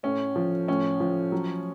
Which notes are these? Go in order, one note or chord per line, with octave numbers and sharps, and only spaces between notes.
A2 C#4
F3
A2 C#4
F3
F#3